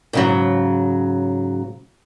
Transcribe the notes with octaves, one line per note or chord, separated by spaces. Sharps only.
G#2 C#3 F#3